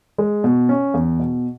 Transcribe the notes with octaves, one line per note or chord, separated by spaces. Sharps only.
G#3
B2
C#4
E2
B2